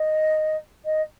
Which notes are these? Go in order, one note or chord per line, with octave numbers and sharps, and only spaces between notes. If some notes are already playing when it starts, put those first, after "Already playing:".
Already playing: D#5
D#5